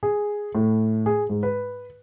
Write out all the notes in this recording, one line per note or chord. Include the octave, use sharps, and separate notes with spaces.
G#4
A2
G#4
G#2
B4